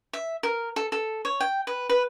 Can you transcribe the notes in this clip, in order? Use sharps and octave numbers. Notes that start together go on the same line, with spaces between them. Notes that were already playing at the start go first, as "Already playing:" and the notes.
E5
A#4
A4
A4
C#5
G5
B4
B4